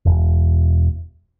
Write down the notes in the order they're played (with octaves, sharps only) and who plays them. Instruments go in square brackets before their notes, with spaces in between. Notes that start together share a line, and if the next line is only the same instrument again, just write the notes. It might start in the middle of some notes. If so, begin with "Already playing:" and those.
[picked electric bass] E1